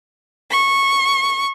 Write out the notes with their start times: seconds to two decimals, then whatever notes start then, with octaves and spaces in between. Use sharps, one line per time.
0.51 C#6